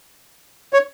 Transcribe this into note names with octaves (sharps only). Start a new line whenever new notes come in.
C#5